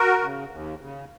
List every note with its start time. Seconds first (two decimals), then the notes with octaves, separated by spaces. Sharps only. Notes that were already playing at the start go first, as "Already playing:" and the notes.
Already playing: F#4 A#4
0.20 C#3
0.51 D#2
0.81 C#3